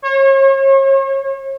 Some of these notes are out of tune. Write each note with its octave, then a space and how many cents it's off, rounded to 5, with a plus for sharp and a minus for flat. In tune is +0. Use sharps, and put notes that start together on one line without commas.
C#5 -40